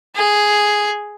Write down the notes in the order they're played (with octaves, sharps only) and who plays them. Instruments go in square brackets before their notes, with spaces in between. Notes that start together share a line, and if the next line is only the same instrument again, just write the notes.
[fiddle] G#4